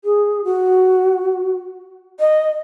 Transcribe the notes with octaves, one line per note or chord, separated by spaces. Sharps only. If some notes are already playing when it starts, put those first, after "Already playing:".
G#4
F#4
D#5